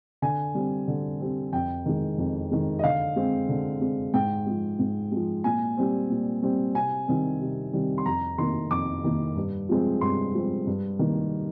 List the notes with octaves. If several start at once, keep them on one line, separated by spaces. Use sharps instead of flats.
D3 G#5
G3 C4
D3
G3 C4
F2 G5
D#3 G#3
F2
D#3 G#3
D#5
D3 F5
G#3 C4
D3
G#3 C4
G#2 G5
F3 G#3
G#2
F3 G#3
A#2 G#5
G3 C4
A#2
G3 C4
C3 G#5
D#3 G3 C4
C3
D#3 G3 C4
C6
F2 A#5
D#3 A#3 C6
F2 D6
D#3 A#3
G2
F3 G#3 C4
G2 C6
F3 G#3 C4
G2
D#3 A#3